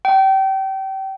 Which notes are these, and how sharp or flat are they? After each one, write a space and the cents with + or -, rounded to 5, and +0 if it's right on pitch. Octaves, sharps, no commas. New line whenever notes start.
G5 -30